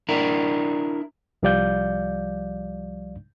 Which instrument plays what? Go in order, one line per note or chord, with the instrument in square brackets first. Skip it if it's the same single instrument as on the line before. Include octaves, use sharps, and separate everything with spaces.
[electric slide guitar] D4 E4 A#4
[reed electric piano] C2 F3 G3 D5 F5 G6